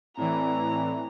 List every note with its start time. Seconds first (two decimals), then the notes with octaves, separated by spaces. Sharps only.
0.17 A2 E3 C4 E4 D5 A#5